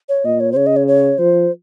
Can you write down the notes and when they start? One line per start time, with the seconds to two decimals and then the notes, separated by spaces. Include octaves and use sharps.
0.09 C#5
0.24 A#2 D#5
0.40 C#5
0.52 C5
0.56 C#3 C#5
0.67 D#5
0.76 C#5
0.88 C#5
1.18 F3 C5